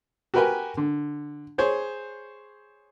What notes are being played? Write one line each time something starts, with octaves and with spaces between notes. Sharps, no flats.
F#4 G4 A#4 B4 G5 G#5
D3
G#4 C5 C#5